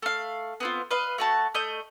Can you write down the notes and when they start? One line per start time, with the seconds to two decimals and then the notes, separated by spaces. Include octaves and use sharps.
0.02 A3 F5
0.60 B3 C4 F4
0.91 B4 D#5 F5
1.18 A3 F#4 A5
1.54 A3 D#5 G6